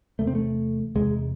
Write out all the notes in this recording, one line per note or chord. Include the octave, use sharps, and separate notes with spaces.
E2 C3 A3
C4
A3
E2 C3 G#3